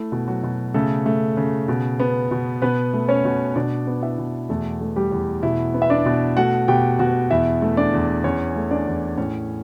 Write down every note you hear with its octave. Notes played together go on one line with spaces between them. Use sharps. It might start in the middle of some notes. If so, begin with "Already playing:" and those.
Already playing: A3 E4
B2
F#3 F#4
B2
C#3 A3 A4
A3
C#3
B2
B3
B2
B2 B3 B4
A3
C#4 C#5
B2
B2 D4 D5
B3
E4 E5
B2
E2 A3 A4
A3
G3 G4
E2
B2 E4
B3
E5
D4 D5
B2
A3 F#4 F#5
B2 G4 G5
B2 F#4 F#5
E2 E4 E5
A3
D4 D5
E2
E2 C#4 C#5
A3
D4 D5
E2
A2 C#4 C#5